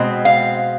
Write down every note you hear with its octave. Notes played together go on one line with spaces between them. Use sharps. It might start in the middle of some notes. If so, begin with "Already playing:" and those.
Already playing: B2 G#3 C4
F5